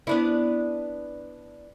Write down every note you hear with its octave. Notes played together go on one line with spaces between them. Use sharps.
B3 D4 E4